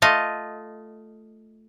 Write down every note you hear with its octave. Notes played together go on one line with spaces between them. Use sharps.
A3 F4 D#5